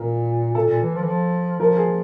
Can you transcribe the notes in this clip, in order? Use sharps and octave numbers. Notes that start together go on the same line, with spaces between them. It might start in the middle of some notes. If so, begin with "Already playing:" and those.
Already playing: A#2 A#4
A#2 A4
A#2
E3
F3
E3
F3
F3 A#4
G#4